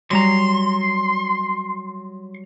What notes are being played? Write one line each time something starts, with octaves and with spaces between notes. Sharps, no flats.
F#3 G3 A#5 C6